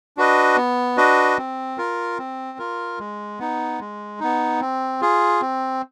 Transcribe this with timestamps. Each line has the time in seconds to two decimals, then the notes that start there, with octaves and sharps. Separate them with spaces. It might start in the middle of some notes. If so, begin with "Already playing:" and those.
0.17 D4 F#4 B4 D#5
0.57 B3
0.97 D4 F#4 B4 D#5
1.38 C4
1.78 F4 A#4
2.18 C4
2.58 F4 A#4
2.99 G#3
3.39 B3 D#4
3.79 G#3
4.20 B3 D#4
4.61 C4
5.01 F4 G#4
5.41 C4